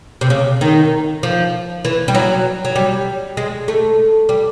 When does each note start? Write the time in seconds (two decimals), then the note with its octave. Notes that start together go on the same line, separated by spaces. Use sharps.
0.21 C3
0.30 C#3
0.61 D#3
1.23 F3
1.85 E3
2.08 G3
2.15 F#3
2.65 F#3
2.76 G3
3.37 G#3
3.68 A3
4.29 G3